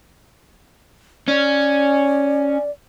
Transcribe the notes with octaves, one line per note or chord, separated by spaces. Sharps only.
C#4 D5